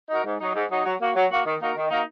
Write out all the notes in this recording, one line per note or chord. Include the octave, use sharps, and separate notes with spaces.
D#4 F#4 A#4
G#2
F#3 D#4
G#2
F#3 D#4
F#3
A#3 F#4
F#3
A#3 F#4
D#3
A#3 D#4 F#4 A#4
D#3
A#3 D#4 F#4 A#4